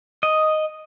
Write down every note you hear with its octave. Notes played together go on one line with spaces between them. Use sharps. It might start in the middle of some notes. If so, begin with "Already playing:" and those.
D#5